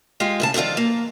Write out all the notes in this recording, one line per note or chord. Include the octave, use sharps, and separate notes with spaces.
G#3 F4 G4
A2 C#3 A5
D3 D#3 F3 F4 D5
A#3